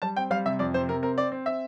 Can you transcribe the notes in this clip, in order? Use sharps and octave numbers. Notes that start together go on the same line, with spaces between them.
G3 A5
C4 G5
G3 F5
C3 E5
F2 D5
C3 C5
C3 A#4
C4 A#4
C4 D5
C4
C4 E5